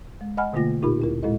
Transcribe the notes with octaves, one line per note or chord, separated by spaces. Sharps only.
G#3
D#5 F#5 G#5 B5 F6
B2 D3 A3 A#3 F4 A#6
A#2 D#4 F4 G4 A#4 B5
D2 E4 A#4
A2 G#3 E4 A4 D#5